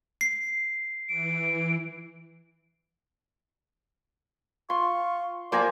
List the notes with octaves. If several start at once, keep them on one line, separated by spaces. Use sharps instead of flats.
C7
E3 D7
F4 C6 C#6
F3 A#3 C5 D5 G#5 A#5